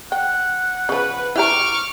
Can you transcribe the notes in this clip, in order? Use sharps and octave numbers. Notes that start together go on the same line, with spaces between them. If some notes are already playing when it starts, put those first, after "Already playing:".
F#5 G5
C#3 F3 B4
E4 G4 A#5 C#6 D6 F6